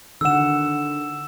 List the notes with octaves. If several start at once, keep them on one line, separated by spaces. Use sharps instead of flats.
D3 D#3 F#5 E6 E7